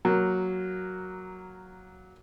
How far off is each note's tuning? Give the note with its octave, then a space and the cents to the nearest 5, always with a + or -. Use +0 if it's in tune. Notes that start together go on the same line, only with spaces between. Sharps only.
F#3 +0 A#3 +0